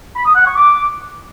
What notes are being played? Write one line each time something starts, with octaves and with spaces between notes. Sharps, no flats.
B5
D#6
F#5
C#6
D6